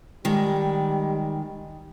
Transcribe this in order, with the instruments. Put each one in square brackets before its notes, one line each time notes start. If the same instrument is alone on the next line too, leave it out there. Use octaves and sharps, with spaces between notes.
[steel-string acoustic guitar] D#3 G#3 D5 [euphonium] G3